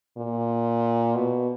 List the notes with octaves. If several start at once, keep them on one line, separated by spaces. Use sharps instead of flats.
A#2
B2